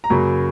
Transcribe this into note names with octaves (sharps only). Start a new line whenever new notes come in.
A#5
F#2 C#3 F#3 A#3 B5